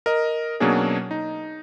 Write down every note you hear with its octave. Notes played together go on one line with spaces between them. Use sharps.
A#4 D#5
B2 F#3 A#3 C#4 D4 G#4
D#4